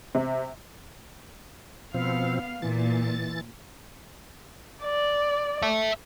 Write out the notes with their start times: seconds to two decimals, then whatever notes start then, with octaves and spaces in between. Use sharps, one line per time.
0.15 C3
1.94 B2 F3 B3 C4 F5
2.62 A#2 E3 A6
4.84 D5
5.62 E5 A5